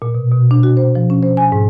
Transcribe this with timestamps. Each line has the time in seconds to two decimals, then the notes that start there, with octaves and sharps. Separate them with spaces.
0.02 A#2
0.15 B2
0.32 B2
0.51 D4
0.63 F#4
0.77 C5
0.95 F3
1.10 C#4
1.23 C5
1.37 G#5
1.52 G#2